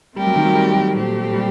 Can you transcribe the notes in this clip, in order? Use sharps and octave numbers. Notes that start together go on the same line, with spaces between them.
G3 A3 C4 G4 A#4
F#3
D#3
F#3
G3
F#3
A#2 A3 C4 G4
G3